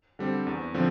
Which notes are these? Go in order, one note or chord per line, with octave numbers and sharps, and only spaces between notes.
D3 G3 C4 G4
E2
D3 F3 C4